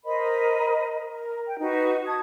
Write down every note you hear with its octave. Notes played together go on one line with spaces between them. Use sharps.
A#4 C5 D#5 B5
A#4
G5
D#4 F#4 B4
A5 D#6 G#6